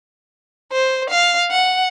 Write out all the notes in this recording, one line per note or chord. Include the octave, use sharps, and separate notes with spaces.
C5
F5
F#5